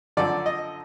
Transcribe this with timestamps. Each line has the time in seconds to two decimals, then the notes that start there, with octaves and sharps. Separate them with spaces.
0.17 F#2 D3 F3 D5
0.46 D#5